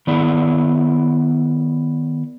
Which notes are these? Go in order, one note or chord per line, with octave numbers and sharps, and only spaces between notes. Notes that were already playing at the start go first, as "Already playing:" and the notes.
D#3 B3 E4 D5